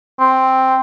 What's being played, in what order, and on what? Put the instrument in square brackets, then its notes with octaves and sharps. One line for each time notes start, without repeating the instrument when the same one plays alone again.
[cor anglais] C4